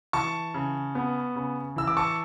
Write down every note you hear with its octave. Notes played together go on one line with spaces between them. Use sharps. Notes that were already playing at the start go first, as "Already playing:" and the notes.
E3 A5 C#6
C#3
B3
C#3
E3 E6
D6
A5 C#6